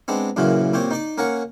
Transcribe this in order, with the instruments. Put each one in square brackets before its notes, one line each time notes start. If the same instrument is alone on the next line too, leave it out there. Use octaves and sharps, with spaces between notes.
[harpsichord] G#3 B3 C4 D4
F#2 A#2 C#3 E3 F4 F#4
A#2 C4 G4 C#5
D#4 D5 D6
A#3 C#4 A#4 C#5 F#5 C#6